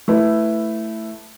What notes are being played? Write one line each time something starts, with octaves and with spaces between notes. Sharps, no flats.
A3 E4 B4